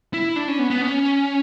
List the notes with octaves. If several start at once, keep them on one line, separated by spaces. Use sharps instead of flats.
E4
D4
C#4
B3
B3
C#4